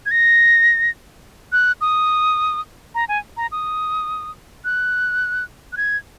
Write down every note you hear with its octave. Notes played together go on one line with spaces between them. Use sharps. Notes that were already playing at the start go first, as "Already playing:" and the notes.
G#6
A#6
F#6
D#6
A#5
G#5
A#5
D#6
F#6
F#6
G#6